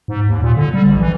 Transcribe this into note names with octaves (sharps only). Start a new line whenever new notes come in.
G#2
D#2
A#2
D3
G3
A#1
E3